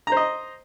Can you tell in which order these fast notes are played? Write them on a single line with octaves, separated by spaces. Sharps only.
A#5 C5 D#5